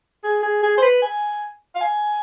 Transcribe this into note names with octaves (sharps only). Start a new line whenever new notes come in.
G#4
G#4
G#4
C5
B4
G#5
F5
G#5